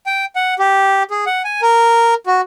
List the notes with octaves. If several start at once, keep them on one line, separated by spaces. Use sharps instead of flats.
G5
F#5
G4
G#4
F#5
G#5
A#4
F#4